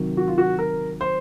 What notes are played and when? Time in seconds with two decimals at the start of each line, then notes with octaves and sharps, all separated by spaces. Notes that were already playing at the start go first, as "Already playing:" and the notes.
Already playing: C3 D#3 F#3
0.17 F#4
0.28 F4
0.38 F#4
0.59 A#4
1.01 C5